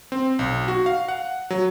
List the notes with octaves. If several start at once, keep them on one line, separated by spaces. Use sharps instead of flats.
C4
B1
F#4
F5
F#5
F#3